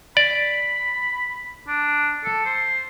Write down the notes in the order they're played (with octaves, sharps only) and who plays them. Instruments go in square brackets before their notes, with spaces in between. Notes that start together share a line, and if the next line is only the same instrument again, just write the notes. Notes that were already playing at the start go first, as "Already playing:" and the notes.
[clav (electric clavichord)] D5 [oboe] B5
[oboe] D4
A4
C5